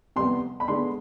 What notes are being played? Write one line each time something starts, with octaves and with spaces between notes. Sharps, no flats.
C3 G3 B3 C6
B5
D3 G#3 B3 C6